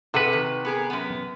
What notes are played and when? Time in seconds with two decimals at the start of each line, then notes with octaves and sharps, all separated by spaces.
0.14 C3 G#4 A4 B4 F#5
0.33 D#3
0.65 B3 G#4 A#4
0.90 F#2 B3